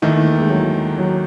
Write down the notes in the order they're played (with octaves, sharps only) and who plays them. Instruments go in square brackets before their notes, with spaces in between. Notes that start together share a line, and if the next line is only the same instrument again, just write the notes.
[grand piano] D#2 D#3 A3 [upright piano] E3
[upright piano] G#3
F#3
F#3